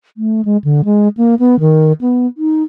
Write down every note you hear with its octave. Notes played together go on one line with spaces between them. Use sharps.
A3
G#3
D3
G#3
A#3
B3
D#3
B3
D#4